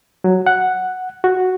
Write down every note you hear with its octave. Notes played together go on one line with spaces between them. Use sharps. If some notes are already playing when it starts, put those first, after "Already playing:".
F#3
F#5
F#4